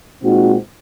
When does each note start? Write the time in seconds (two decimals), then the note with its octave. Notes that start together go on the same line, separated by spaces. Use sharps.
0.21 A#2 G#3 C4 D#4 F#4